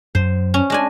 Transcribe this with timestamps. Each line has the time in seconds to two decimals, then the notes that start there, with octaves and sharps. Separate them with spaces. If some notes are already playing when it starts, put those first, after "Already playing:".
0.15 F#2 F#3 C5
0.54 C#4
0.70 G#3 D4 G#5